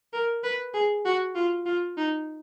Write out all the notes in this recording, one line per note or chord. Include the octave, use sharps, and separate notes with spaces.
A#4
B4
G#4
F#4
F4
F4
D#4